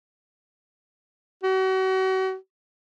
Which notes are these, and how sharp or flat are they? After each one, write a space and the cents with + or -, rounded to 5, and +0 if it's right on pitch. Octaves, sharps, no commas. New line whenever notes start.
F#4 +40